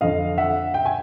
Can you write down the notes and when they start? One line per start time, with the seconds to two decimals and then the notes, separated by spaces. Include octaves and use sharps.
0.01 F2 D3 D#5 F5
0.38 E5 F#5
0.74 G5
0.86 G#5